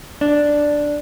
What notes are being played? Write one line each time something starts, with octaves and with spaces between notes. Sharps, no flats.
D4